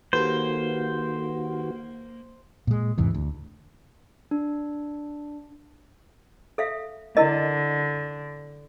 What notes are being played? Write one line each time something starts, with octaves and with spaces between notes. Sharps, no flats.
D#3 A#3 F#4 G4 A4 B4 C5
A#2 G#3
E2 G#2 C3 E3
D2
D4
A4 E5 F5
D3 E4 A#4 D#5